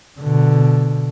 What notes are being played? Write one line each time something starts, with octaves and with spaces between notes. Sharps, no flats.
B2 D3